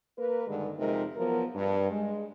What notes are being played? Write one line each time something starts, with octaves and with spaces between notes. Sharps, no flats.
A#3 A#4 B4
G2 D3 D#3 G#3
F2 C3 G#3 D#4 A#4
F3 F#3 B3 A#4
G2
G#3